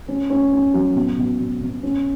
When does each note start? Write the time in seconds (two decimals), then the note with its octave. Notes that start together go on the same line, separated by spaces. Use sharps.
0.08 C#4
0.30 C#4
0.52 C#4
0.74 F#3
0.95 B2
1.17 B2
1.39 B2
1.61 B2
1.83 C#4